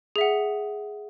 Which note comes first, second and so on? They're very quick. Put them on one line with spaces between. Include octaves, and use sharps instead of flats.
G#4 E5 F#5